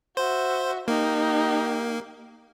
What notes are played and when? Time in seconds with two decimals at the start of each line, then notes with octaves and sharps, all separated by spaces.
0.17 F#4 C5 E5
0.88 A#3 D#4 G4